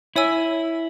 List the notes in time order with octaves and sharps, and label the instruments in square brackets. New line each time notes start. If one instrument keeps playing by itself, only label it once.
[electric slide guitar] E4 [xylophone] C#5 G#5 E6